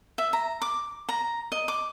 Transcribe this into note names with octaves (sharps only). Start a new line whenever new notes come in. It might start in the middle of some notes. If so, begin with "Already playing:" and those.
E5
A#5
D6
A#5
D#5
D6